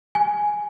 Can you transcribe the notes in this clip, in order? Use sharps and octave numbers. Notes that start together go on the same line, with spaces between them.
G#5